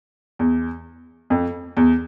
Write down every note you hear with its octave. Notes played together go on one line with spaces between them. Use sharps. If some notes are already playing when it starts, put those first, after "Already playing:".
E2
F2
E2